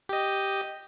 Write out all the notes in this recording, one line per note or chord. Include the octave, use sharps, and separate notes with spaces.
G4 D#5